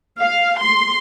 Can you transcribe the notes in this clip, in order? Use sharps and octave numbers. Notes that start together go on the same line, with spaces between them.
F5
C6